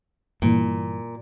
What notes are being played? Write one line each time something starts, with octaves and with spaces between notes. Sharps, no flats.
G2 A#2 E3